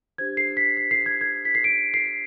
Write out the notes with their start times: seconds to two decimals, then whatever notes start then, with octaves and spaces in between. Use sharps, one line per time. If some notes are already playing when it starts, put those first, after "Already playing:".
0.18 D4 G4 C5 G#6
0.37 C7
0.57 B6
0.77 C7
0.91 C7
1.06 G#6
1.21 G#6
1.45 B6
1.55 C7
1.64 D7
1.94 C7